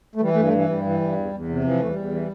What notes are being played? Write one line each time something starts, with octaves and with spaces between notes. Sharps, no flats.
A3
E3 G3
A3
G2
A3
E3
G2 G3
E3
G2
E2
E2
C3
E3 F3
E2 A3
G3
E2
E3